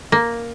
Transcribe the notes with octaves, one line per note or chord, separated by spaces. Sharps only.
A#3